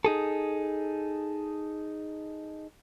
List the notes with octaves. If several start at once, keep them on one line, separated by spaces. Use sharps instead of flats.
D#4 G#4 A4